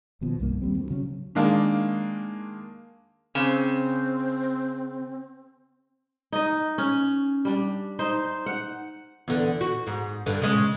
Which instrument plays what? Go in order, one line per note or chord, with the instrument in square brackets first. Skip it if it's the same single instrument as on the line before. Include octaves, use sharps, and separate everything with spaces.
[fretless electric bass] D#1 D#2 B2 F3
C2 G2 A#3
D#2 G3 C4
D2
C#3 F#3 C#4
[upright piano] D#3 G#3 A#3 D4
[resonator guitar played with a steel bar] C#3 [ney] C4
[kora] D#4 D#5
C#4
G3 D4
D#4 C5
F#5
[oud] E2 D3
F#4
G#2
G2 D3
C#3 G#3